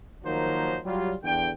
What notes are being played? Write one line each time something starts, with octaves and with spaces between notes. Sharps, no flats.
D#3 F3 F#3 A#3 D#4 C5
F#3 G3 F4
E2 D3 G5